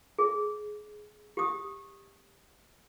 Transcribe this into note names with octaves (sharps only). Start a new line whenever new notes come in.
G#4
G4 D#6